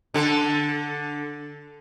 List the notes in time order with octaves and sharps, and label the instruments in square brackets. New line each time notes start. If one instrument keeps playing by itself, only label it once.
[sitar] D3 A4